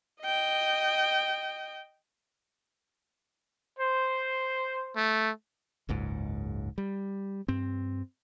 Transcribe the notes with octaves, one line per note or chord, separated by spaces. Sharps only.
D#5 G5
C5
A3
F#1 C#2 G#2
G3
G2 C4